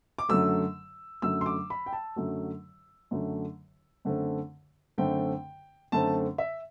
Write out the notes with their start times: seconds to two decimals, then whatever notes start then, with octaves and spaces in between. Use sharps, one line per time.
0.19 D6
0.29 F#2 D3 F#3 A3 E6
1.22 F#2 D3 F#3 A3 E6
1.41 C6
1.46 D6
1.70 B5
1.86 G5
1.93 A5
2.16 F#2 D3 F#3 A3
3.11 F#2 D3 F#3 A3
4.05 F#2 D3 A3 C4
4.98 F#2 D3 A3 C4 G5
5.92 F#2 D3 A3 C4 A5
6.38 E5